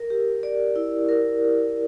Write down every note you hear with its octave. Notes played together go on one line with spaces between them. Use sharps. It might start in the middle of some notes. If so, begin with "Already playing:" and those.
Already playing: A#4
G4
D5
E4
A#4